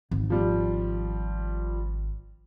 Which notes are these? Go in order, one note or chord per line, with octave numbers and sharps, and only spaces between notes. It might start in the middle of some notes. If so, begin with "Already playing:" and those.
G#1
F3 G3